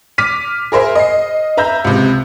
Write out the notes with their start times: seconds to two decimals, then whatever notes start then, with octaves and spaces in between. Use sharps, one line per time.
0.18 D6 F6 B6 D#7
0.72 G#4 A#4 C5 E5
0.95 D#5 C7
1.57 B4 E5 A#5 E6 G6
1.84 C#2 C3